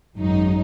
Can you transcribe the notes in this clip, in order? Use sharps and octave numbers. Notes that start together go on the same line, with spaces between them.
G#1 F#2 F#3 D#4